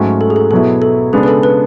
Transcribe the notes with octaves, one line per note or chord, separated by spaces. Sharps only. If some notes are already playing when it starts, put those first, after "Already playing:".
Already playing: G#2 F#3 A3 C#4
A4
G#4
A4
B2 F#3 B3 E4 A4
A4
C#3 G#3 B3 D4 G#4
B4
A4
B4